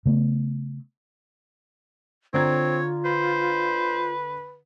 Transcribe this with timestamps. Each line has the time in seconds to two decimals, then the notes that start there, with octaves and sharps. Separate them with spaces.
0.06 C#3 A3 B3
2.34 D3 C4 F4 C#5 A#5 G#6
3.05 B4 C5